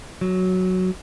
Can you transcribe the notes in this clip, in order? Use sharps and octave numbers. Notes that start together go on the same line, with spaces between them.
F#3